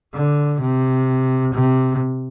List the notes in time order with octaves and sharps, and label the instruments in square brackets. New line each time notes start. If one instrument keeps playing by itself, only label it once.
[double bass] D3
C3
C3